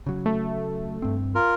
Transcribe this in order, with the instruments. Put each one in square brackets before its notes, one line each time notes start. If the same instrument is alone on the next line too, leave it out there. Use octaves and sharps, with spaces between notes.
[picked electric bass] C#3 F#3
[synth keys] A3
[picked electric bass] G2 C4
[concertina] F4 A#4